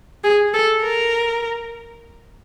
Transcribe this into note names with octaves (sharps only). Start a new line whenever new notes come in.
G#4
A4
A#4